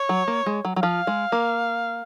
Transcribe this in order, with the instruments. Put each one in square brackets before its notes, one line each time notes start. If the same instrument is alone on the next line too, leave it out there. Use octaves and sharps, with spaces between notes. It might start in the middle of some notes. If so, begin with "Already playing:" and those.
Already playing: [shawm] C#5
[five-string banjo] F#3
A#3
G#3
F#3
F#3
[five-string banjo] F3 [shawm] F5
[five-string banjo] G#3
A#3